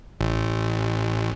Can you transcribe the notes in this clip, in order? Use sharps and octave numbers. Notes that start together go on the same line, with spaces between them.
A1